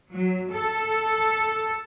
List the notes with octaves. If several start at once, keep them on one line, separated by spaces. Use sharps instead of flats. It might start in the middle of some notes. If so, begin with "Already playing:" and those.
F#3
A4